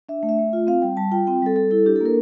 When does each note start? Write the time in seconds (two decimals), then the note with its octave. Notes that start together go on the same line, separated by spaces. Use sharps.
0.09 D4 E5
0.23 A3
0.29 E5
0.39 A3
0.53 F4
0.67 C4 F5
0.82 G3 G5
0.97 G3 A5
1.11 F4 G5
1.27 C4 G5
1.42 G3 A4
1.56 G3 A4
1.71 E4 A4
1.86 D4 G4
1.96 A4
2.01 A#3 A#4